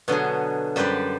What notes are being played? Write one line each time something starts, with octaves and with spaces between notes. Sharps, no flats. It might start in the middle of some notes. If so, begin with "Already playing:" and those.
B2 D3 F#3 G#4
F#2 G3 G4 B4 C5 D5